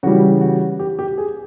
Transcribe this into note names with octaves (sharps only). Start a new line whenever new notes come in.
C#3 E3 G3 F#4
F#4
G4
G4
G#4